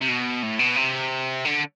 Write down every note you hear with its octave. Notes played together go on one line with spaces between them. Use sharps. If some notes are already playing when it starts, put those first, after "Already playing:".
C3
B2
A2
B2
C3
D3